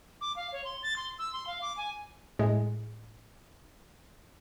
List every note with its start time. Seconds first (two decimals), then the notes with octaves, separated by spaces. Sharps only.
0.21 D6
0.36 F5
0.52 C#5
0.65 C6
0.83 A6
0.96 C6
1.19 E6
1.33 C6
1.47 F5
1.62 D6
1.77 G#5
2.39 A2 G#3